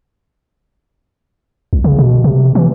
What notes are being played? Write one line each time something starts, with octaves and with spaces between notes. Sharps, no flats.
C2
C#3
B2
C3
E3